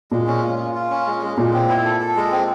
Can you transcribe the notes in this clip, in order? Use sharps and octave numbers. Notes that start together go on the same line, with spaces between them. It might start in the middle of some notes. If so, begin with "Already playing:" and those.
A#2 G#3
C#4
F4
F4
F4
C#4
G#3
G#3
A#2 G#3
C4
E4
A4
A4
G#3
C4